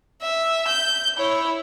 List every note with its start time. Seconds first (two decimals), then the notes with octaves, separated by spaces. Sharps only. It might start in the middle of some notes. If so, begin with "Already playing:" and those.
0.22 E5
0.68 G6
1.17 E4 C#5